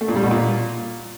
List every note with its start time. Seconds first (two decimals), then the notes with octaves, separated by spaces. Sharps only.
0.01 A3
0.08 A#2
0.16 G3
0.23 B2
0.31 A#2